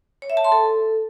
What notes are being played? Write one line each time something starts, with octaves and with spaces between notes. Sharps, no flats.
C#5
E5
A5
C6
A4